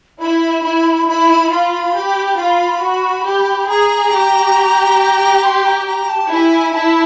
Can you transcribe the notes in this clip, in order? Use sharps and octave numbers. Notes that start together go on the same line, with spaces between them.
E4 B5
E4
E4 B5
F4 B5
G4
F4
F#4
G4
G#4 A#5
G4
C6
A#5
A#5
A5
E4 G#5 A5
E4 A5